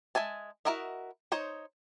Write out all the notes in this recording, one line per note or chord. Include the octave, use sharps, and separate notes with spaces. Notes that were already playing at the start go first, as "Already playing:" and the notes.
G#3 E5 G#5 A5
E4 F#4 A#4 D#5 E5
D#4 C5 C#5